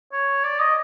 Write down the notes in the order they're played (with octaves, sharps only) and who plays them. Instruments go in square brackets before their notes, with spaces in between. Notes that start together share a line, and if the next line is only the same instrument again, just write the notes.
[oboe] C#5
D5
D#5